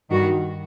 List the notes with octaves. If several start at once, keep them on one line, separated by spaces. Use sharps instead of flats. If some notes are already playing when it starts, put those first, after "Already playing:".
G2 D#3 G3 F#4